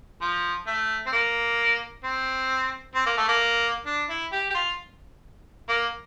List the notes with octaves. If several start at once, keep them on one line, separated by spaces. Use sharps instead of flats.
F3
A3
C4
A#3
C4
C4
A#3
A3
A#3
D4
E4
G4
G4
F4
A#3